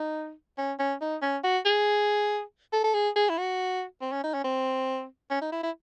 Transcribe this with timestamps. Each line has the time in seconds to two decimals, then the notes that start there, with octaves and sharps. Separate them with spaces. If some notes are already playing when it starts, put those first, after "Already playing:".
Already playing: D#4
0.58 C#4
0.79 C#4
1.01 D#4
1.22 C#4
1.44 F#4
1.65 G#4
2.73 A4
2.84 A4
2.94 G#4
3.16 G#4
3.29 E4
3.38 F#4
4.01 C4
4.12 C#4
4.23 D#4
4.34 C#4
4.44 C4
5.31 C#4
5.41 D#4
5.52 E4
5.63 E4